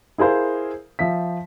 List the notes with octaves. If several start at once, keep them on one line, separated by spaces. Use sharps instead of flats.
E4 G#4 A#4 C5 F5
F3 E5 B6